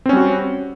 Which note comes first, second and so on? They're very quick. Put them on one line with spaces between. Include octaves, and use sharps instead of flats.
C4 C#4 G3 F#4